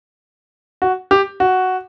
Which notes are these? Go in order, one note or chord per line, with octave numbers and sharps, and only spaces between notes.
F#4
G4
F#4